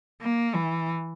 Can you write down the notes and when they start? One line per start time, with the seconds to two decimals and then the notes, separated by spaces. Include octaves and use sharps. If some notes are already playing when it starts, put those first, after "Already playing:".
0.22 A#3
0.55 E3